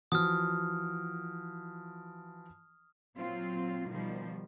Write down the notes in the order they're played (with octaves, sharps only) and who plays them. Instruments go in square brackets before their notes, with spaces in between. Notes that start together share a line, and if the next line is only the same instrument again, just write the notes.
[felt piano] E3 F3 F#4 [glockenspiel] D#6 F6
[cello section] A#2 F#3 C4 F4
B2 D#3 F3 G3